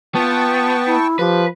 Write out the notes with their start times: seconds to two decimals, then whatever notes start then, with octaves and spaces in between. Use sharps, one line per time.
0.15 B3 F4 G5 A5 C#6
0.86 E4
1.19 F3 G4 B4